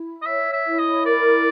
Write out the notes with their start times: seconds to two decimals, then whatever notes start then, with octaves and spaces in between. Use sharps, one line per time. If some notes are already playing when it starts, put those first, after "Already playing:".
Already playing: E4
0.22 D#5
0.26 C#5 E5
0.53 E5
0.66 E4
0.79 D#5
1.05 A#4 D5